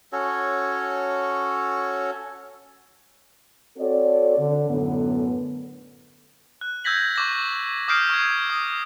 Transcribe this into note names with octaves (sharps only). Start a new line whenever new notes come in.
C#4 F#4 A4 C#5
C4 F#4 A4 C#5 D5
D3
F#2 A2 D3 B3
F#6
E6 G6 G#6 A#6 B6 F#7
C#6 D6 A#6
D6 D#6 F6 G6 C7 D7
C#6 G#6
D#6